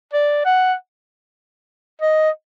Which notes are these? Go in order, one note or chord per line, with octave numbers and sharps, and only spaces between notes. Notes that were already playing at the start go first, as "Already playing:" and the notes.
D5
F#5
D#5